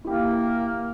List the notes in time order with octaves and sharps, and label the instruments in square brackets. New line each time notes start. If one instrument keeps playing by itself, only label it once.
[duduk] A#3 [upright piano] E4 G4